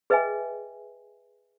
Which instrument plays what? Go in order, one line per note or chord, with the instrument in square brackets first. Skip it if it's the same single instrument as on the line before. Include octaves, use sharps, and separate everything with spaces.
[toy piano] G#4 B4 D#5 E5 G5 G#5